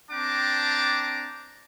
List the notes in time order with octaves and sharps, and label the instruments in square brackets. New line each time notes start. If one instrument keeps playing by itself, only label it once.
[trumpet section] C4 D4 G5 A5 A#5 D6